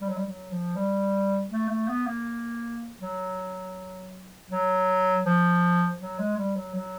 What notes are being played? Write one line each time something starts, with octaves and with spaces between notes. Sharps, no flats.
G3
F#3
G3
F#3
F3
G3
A3
A3
B3
A#3
F#3
F#3
F3
F#3
G#3
G3
F#3
F#3